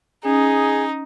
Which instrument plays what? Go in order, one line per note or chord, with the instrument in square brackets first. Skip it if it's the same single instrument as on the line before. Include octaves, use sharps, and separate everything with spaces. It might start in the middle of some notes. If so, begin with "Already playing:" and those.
[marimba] C#4 [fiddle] D#4 [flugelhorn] G#4